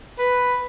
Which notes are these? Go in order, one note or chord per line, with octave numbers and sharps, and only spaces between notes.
B4